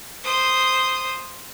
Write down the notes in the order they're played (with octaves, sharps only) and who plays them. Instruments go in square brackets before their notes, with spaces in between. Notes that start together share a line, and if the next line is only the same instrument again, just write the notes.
[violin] C5 D#6